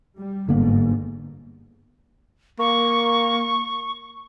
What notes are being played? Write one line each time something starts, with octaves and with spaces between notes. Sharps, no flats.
G3
G1 G#2 D3 A#3 B3
A#3 C#6